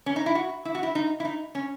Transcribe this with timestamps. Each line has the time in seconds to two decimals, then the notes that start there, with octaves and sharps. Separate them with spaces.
0.06 C#4
0.16 D#4
0.26 E4
0.35 F#4
0.65 E4
0.75 F#4
0.83 E4
0.95 D#4
1.20 E4
1.25 D#4
1.55 C#4